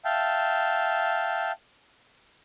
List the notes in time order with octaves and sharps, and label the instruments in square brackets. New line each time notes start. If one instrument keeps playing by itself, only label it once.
[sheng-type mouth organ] E5 F5 G5 A5